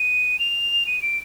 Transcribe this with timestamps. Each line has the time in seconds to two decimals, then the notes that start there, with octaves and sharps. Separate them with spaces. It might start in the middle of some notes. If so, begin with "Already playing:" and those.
Already playing: D#7
0.39 F7
0.87 D#7
1.02 D7